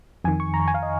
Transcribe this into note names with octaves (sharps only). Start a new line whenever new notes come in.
F2 D#3 G#5
C#6
A#5
G#5
F5
D#5